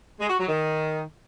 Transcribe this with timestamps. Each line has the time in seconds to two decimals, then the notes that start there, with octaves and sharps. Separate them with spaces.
0.20 G#3
0.29 F#4
0.39 F#3
0.48 D#3